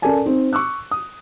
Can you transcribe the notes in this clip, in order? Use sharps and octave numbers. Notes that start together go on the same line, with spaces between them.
C#4 A4 A#4 D5 G#5 A5
C4 D#4
C#6 D6 E6 F#6
D#6